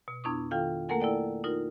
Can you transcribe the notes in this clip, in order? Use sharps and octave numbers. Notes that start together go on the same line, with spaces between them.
B2
F2 B3 D4 E4 C#6 D#6
D#3 F4 A4 F5 G5
A3 A#3 A4 A#4 F#5 G#5
E4 A4 D5 G5
D#4 F4 A#4